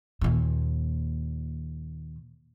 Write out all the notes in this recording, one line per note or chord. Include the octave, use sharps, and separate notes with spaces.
D#2 A#2